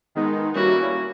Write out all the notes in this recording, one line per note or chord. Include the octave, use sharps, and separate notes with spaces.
D#3 G#3 B3 D#4
G3 A#3 C#4 E4 F#4